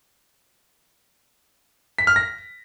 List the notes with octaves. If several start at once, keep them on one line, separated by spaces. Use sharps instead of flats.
B6
F6
A#6